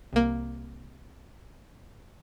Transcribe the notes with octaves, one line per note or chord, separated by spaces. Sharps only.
C2 A#3